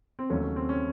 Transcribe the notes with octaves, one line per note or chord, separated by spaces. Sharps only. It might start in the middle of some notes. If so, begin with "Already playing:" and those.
C4
D#2 C#3 F#3 A3 C#4
C#4
C4
C#4